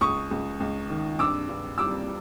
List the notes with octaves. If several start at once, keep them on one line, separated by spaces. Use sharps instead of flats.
C#2 C#6 D#6
C#2
C#2
D#3
G2 D6 E6
G2
G3 D6 E6